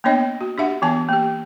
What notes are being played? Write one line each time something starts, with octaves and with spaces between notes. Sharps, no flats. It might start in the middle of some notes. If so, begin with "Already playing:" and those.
A#3 B3 D4 C#5 D#5
F#4
D4 G4 E5 F#5
E3 B3 G#5 A5
A#3 G4